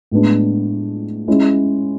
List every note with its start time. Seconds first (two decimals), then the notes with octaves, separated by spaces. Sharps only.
0.11 A2 G#3 B3 D4
1.28 G#3 C#4 E4